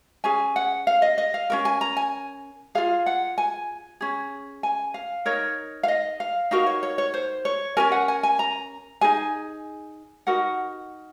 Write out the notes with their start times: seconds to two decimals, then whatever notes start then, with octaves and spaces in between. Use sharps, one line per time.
0.24 C#4 G#4 G#5
0.56 F#5
0.87 F5
1.02 D#5
1.18 D#5
1.34 F5
1.50 C#4 F#4 A#4
1.65 G#5
1.81 A#5
1.97 G#5
2.75 F4 G#4 F5
3.06 F#5
3.38 G#5
4.01 C#4 G#4
4.63 G#5
4.94 F5
5.26 D#4 A#4 C#5
5.83 F5
5.88 D#5
6.20 F5
6.51 D#4 F#4 A#4 F5
6.67 C#5
6.83 C#5
6.98 C#5
7.14 C5
7.45 C#5
7.77 C#4 F#4 A#4 G#5
7.92 F#5
8.08 G#5
8.23 G#5
8.39 A#5
9.01 D#4 G#4 G#5
10.27 D#4 F#4 A#4 F#5